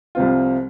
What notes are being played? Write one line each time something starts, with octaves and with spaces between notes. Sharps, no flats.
C2 C3 F3 C4 F4